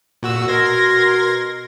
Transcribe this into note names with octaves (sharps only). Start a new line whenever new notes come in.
A#2 F#4 E6
B2 A#4 C6 G#6 A#6